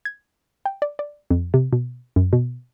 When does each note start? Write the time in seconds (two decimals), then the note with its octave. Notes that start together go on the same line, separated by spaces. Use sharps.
0.05 G#6
0.66 G5
0.82 D5
0.99 D5
1.31 F2
1.54 C3
1.73 B2
2.16 F#2
2.33 B2